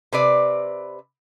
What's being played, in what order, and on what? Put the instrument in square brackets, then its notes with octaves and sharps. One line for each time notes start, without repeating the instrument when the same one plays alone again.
[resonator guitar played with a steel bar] C3 B4 D5